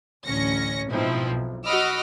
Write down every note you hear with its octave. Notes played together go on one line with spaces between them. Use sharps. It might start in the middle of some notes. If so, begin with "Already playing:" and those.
A1 D2 C#4 A#6 C#7
G#2 B2 F3 C4 D#4 E4
B1
F#4 D#5 B5 D6 E6 F6